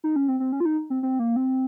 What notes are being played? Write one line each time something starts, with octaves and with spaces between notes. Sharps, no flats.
D#4
C#4
C4
C4
C#4
F4
D#4
C4
C4
A#3
C4